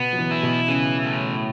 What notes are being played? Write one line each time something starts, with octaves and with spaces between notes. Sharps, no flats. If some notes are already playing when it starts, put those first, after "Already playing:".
Already playing: B2 B3
F#3
E3
E4
B2
C#3 E3
A2